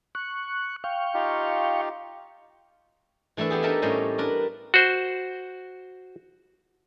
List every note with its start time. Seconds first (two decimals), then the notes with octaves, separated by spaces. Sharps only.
0.15 C#6 F#6
0.84 F5 G5 C#6
1.14 D#4 F4 G4
3.37 E3 A3 D4 E4 E5
3.50 B3 G4 G#4
3.63 D4 D#4 A4 A#4 D#5 E5
3.82 A2 G3 C#4 C5 D#5
4.18 D4 A#4 B4
4.74 F#4 C5